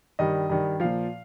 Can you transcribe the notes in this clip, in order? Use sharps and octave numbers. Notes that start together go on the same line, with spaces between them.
G2 D#3 G3 D#5
G2 D#3 G3
A#2 F3 F5